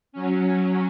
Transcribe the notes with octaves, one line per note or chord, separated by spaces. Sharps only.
F#3 C#4